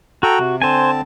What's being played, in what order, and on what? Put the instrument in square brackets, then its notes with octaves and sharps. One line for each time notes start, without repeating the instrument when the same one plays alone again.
[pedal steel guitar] F#4 [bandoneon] A4 G5 A#5
[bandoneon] C3
[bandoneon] D3 C4 A5 [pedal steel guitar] C5 G#5